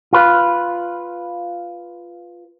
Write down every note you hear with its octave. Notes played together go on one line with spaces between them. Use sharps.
F4 B4